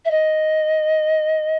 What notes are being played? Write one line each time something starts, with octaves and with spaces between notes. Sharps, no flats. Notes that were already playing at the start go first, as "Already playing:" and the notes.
E5
D#5